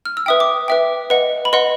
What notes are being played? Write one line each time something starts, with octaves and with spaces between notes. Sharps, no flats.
F6
E6
B4 E5 G5 D#6
D6
B4 E5 G5
B4 D#5 F#5
B5
B4 D#5 F#5 C6